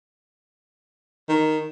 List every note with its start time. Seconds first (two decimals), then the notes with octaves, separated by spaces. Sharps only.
1.29 D#3